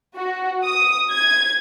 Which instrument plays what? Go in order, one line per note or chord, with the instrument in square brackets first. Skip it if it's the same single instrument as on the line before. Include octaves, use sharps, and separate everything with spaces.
[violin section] F#4
D#6
G#6